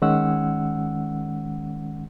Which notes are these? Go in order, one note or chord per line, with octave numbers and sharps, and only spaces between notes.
D#3 G#3 C#4 F#5 E6